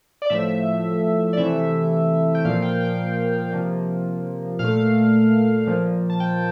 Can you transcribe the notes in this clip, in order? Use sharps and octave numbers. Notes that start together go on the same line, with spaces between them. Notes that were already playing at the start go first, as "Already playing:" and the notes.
D5
A2 F3 A3 E5
D5
C3 E3 A3 E5
G5
A#2 F3 A#3 F5
G5
G5
C3 F3 A#3
A#2 A3 F5
A#2 F3 A#3
A5
G5